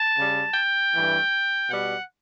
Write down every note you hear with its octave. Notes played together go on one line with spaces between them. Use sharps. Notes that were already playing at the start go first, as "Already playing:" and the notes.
Already playing: A5
C#3 G3
G5
G2 E3 A3
B2 G3 F#5